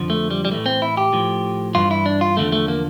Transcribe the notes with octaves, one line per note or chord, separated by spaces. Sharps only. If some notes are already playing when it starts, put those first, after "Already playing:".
Already playing: F2 D3 F3
A3
G3
G3
A2 E3 A3
C4
E4
G4
A2 F3
G2 E3 F4
E4
D4
F4
E2 D3 F3 A3
A3
A#3